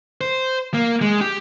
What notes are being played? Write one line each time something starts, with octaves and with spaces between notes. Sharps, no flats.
C5
A#3
G#3
G4